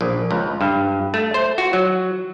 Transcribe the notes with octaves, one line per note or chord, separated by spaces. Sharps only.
A#1
C#2
G2
A3
C5
F#4
F#3